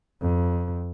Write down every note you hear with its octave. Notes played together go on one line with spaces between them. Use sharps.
F2